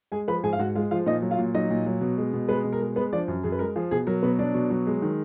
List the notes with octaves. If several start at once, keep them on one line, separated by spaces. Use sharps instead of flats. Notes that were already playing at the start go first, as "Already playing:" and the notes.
G#3 G#4 G#5
F3 B4 B5
G#2 G#4 G#5
F5
G#2 F#4 F#5
G#3 F4 F5
F3 F4 F5
A#2 D#4 D#5
F#3
F4 F5
A#2
F#3 D#4 D#5
A#2
F#3
B2
G#3
B2
G#3 B3 B4
B2
A#4
G#3
G#3 B3 B4
F3 D4 D5
F#2
F#2 G#4
B4
G#3 A#4
F3 G#4
B2 G#4
F#3 A#4
B2 B3 B4
F#3 D4 D5
B2
F#3
G#3
D#3